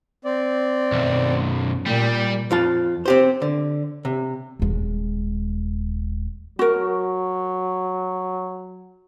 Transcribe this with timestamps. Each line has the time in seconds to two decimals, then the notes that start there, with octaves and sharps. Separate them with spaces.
0.25 C4 D5
0.92 B1 F#2
1.86 A#2 G3 G5
2.51 F2 F4 A5
3.06 C4 G4 C5
3.42 D3
4.05 C3
4.59 D#1 G#3
6.59 F#3 F#4 A#4